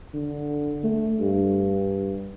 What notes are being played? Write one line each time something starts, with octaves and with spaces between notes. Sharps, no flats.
D3
A3
G2